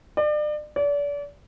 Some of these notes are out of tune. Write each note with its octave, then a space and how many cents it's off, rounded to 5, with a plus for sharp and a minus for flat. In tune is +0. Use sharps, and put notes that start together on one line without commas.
D5 +35
D5 -35